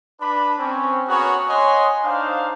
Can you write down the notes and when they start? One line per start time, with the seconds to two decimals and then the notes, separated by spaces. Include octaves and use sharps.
0.21 D4 B4 B5
0.59 C4 C#4
1.09 B3 C#4 F#4 G#4 A#4 C#5
1.49 C#5 D#5 F#5 G#5 C6
2.04 D4 D#4 C5 F5